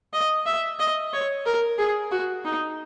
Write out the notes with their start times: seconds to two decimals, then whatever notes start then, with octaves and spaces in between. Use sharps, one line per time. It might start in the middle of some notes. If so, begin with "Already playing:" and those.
0.13 D#5
0.46 E5
0.79 D#5
1.13 C#5
1.46 A#4
1.78 G#4
2.11 F#4
2.45 D#4